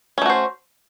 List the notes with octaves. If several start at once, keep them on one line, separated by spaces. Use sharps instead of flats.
A3 C#4 F#4 C5